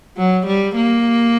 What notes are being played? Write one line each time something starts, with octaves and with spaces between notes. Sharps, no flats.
F#3
G3
A#3